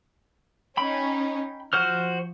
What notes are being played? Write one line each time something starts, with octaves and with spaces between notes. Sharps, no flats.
C#4 D#4 G5 B5
F3 F#4 C5 F6